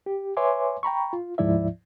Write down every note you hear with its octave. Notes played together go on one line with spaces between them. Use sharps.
G4
B4 C#5 E5 G#5 C6 D6
G5 A#5 B5 C#6
F4
D2 G#2 F3 E4 D5 E5